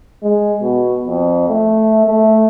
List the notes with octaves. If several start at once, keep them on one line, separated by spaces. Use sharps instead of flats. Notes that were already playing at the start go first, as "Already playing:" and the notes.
G#3
B2
F2
A3
A3